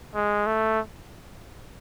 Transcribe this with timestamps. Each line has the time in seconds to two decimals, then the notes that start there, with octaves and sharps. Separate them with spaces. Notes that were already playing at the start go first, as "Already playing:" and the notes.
0.15 G#3
0.47 A3